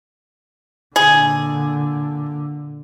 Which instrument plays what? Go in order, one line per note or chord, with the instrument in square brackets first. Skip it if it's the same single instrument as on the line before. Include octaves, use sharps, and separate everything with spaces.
[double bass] A#2 D3 [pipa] G#4